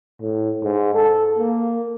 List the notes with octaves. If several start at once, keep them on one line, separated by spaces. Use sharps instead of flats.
A2
G#2
A4
A#3